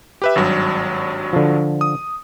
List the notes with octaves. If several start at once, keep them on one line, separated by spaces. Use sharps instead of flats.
G4 B4 E5
G#1 G2 F#3
D3 F3
D#6